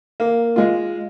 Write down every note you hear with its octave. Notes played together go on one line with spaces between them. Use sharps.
A#3
G#3 F4